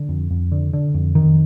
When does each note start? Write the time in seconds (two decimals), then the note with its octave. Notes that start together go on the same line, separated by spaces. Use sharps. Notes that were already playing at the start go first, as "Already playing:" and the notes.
Already playing: D3
0.09 F2
0.31 F2
0.52 D3
0.73 D3
0.94 F2
1.15 F2 D#3